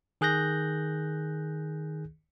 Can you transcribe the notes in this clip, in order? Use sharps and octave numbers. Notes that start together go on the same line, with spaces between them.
D#3 G#4 F#6 G6 A#6